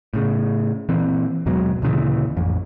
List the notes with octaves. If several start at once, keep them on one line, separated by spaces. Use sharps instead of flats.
A2 C#3
A#2 E3 C4
D#2 G#2 B2 F#3
D2 A#2 C#3 E3
A1 F2